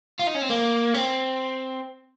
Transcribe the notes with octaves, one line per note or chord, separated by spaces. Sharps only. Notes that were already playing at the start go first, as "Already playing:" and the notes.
F4
D#4
C#4
C4
A#3
C4